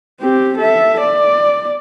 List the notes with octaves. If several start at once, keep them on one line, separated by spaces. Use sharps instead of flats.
C4 G4
A4 E5
D5